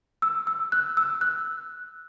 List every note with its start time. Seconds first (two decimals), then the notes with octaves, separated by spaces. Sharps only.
0.22 E6
0.47 E6
0.72 F#6
0.97 E6
1.21 F#6